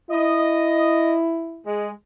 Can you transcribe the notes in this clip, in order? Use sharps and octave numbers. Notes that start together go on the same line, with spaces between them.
E4 D#5
G#3